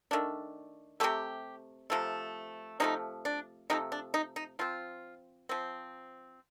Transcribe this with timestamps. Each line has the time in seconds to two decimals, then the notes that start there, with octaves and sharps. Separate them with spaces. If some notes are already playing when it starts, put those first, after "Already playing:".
0.11 D#3 A3 D4
1.00 C3 F3 A3 G4
1.90 C3 F3 A3
2.80 C3 F3 A3 D#4
3.25 D4
3.70 C3 F3 A3 D#4
3.92 D4
4.14 D#4
4.36 D#4
4.59 F3 C4 F4
5.49 F3 C4